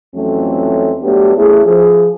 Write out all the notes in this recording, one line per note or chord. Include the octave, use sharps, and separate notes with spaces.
F2 E3 F#3 A3 C4 C#4
F#3 A3 B3 D4 G4
C#3 A3 E4 G#4
F3 G#4